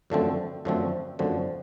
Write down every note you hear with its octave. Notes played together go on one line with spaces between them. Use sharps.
F#2 D3 F3 A3 C4
F#2 D3 F3 A3 C4
F#2 D3 F3 A3 C4